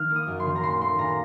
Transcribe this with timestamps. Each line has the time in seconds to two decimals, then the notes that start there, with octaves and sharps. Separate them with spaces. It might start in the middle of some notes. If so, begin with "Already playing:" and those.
Already playing: D#3 F6
0.10 A#3
0.16 D#6
0.27 F#2
0.40 C6
0.45 D#3
0.56 A#5
0.63 A#2 C6
0.81 A3 C6
0.98 A#2 A#5